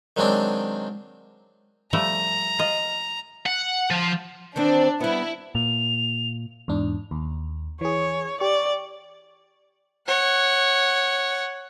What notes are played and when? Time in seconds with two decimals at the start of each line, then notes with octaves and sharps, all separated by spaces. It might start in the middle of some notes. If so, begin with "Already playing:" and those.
0.17 D#3 F#3 G#3 C4 D4
1.93 F3 G3 A3 A#5
2.59 F4 D#5
3.46 F#5
3.91 F3
4.56 D#3 E3 C4 D4
5.01 G3 B3 E4
5.55 A#2 F7
6.68 E2 G#2 D4
7.11 D#2
7.81 E3 G#4 C#5
8.40 G4 D5 C#6
10.07 C#5 F#5